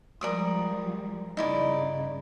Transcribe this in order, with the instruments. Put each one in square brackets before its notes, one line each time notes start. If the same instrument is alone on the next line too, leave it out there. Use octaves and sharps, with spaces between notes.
[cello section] F3 G3 G#3 [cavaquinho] A#4 D5 D#6
[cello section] G2 C#3 [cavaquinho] D#4 E4 D5